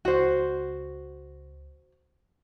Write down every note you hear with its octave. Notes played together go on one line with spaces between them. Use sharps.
C#2 F#4 C5